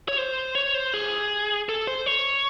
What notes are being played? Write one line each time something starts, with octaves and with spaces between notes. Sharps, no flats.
C#5
C5
C#5
C5
G#4
A4
C5
C#5